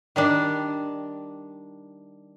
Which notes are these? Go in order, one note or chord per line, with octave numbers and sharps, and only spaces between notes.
D#3 G3 D4